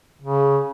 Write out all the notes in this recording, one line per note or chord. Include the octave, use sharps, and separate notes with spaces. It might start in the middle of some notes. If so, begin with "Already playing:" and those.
C#3